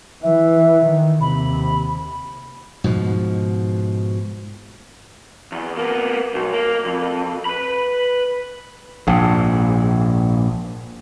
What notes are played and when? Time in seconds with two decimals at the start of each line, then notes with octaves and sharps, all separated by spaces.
0.23 E3 E5
0.85 D#3
1.21 D#2 C3 B5
2.84 G#2 B2 F3
5.52 E2
5.77 A#3 B3
6.34 B1
6.53 A#3
6.85 F2
7.45 B4 B5
9.07 A#1 G#2